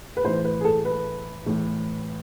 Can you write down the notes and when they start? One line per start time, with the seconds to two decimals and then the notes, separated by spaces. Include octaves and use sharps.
0.17 B4
0.24 A2 E3 C5
0.45 B4
0.61 G#4
0.65 A4
0.85 B4
1.46 A2 E3